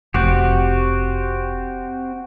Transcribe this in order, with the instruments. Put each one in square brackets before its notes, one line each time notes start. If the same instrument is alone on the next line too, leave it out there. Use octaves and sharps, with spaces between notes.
[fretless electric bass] F1 [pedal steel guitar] C4 F#4 G4